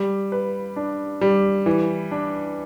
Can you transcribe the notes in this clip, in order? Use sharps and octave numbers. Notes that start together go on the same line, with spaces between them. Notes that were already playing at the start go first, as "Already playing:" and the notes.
Already playing: G3
B4
D4
G3
E3
D4